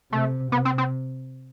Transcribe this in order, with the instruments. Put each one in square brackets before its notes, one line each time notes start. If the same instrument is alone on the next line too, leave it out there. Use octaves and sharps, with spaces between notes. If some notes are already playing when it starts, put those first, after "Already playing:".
[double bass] C3 [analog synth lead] A3
[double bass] C3 [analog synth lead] B3
[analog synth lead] C4
C4